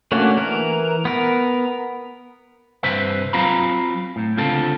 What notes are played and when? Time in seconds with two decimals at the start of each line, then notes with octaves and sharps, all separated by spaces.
0.12 A3 A#3 C#4 D4 F#4
0.37 E3 A#4
1.05 B3 A#4
2.83 G2 C3 B4 C5 E5
3.33 F#3 C4 F4 F5 A#5 B5
4.16 A2
4.37 C#2 D3 C4 F4 A4